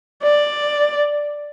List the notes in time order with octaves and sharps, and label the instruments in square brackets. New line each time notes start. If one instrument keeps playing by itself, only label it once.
[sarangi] D5